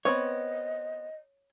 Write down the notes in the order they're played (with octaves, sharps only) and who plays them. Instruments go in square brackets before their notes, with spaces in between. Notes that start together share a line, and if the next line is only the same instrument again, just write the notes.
[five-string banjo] B3 C4 B5 [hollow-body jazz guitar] C#5 [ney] D#5